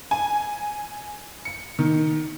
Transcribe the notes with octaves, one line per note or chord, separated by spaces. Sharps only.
G#5
C#7
D#3